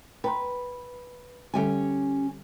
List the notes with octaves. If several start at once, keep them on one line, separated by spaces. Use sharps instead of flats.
B4 G5 A#5 C6
D3 G3 C#4 G4 A4 G#5